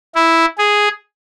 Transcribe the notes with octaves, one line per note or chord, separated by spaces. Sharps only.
E4
G#4